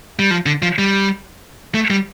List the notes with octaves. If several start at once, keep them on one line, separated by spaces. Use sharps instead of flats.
G3
F3
D3
F3
G3
A3
G3